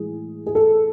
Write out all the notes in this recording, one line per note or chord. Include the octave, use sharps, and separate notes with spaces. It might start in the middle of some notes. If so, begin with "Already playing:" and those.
Already playing: A2 E3 G#3 G#4
G#4
A4